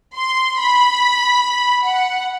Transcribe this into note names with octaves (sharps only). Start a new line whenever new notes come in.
C6
B5
F#5